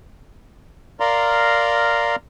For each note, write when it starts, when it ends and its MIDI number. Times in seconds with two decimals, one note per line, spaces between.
1.00 2.16 70
1.00 2.16 74
1.00 2.16 77
1.00 2.16 82
1.00 2.16 84